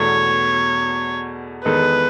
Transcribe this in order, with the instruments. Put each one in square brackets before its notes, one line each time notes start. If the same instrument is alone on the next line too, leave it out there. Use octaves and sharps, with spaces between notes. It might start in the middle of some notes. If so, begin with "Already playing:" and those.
Already playing: [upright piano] E2 B2 A3 [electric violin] C#5
[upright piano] E2 D#3 G#3 D#4 A4 [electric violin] B4